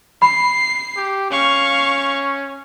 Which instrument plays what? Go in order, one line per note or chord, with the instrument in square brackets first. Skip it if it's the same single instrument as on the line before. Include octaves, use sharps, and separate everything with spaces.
[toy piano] B5 [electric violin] C7
[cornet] G4
[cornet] C#4 [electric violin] F5 C#6